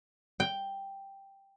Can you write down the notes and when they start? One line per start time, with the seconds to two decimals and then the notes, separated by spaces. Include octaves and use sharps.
0.40 G5